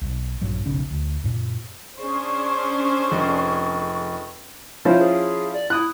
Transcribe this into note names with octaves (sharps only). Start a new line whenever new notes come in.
B1
A#1 G2 F#3
F1 B1 C#3 C#4
D2
F#2 A#2
C#4 D4 G#4 C5 C#6
F1
F3 C#4 E4 C5
G#4
D5
E4 D#6 F#6